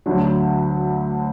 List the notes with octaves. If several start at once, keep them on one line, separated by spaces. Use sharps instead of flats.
D2 D3 F#3